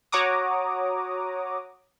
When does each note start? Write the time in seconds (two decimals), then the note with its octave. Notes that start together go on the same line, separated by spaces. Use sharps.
0.12 F#4 C#5 F#5 A#5 D6 D#6